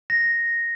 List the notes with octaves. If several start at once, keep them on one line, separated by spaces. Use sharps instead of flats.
A#6